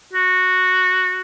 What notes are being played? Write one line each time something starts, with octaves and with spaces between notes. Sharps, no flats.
F#4